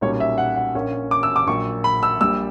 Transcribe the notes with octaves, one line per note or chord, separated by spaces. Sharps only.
B1 A#2 G3 C#4 C#5
E5
F#5
F#5
A#1 A#2 A#3 C#4
D6
E6
D6
A#1 A#2 F#3 C#6
B5
E6
A#1 A#2 G3 E6